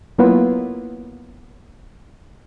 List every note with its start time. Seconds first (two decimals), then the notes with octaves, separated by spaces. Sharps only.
0.18 F#3 A#3 B3 E4 F4 B4